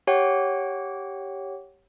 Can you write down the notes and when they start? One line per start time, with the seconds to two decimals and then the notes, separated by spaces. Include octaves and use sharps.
0.07 G4 C#5 F#5 G5